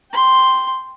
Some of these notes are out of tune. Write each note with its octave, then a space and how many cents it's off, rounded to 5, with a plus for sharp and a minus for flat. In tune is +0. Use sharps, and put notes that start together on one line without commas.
G5 +0 C6 +0